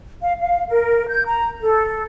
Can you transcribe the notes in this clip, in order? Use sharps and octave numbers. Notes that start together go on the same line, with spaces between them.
F5
F5
A#4
G6
A#5
A4